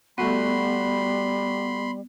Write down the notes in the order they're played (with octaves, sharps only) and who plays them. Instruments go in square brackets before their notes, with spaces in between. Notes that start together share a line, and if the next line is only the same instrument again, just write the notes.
[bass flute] G3 [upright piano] A3 F#4 [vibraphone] B3 [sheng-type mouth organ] B5 C6